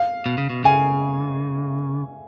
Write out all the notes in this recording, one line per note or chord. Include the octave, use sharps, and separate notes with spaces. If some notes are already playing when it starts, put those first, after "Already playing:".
Already playing: F5
B2
C#3
B2
C#3 G#5